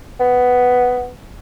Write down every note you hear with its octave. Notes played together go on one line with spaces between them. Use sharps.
B3